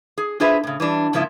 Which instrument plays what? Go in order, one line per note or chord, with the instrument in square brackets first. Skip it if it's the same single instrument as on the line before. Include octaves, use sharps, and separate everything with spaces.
[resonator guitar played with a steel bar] G#4
D4 F4 G#4 B4 C5 E5
A2 C#3
E3 G3 D4
G#2 C#3 F3 A#3 E4 E5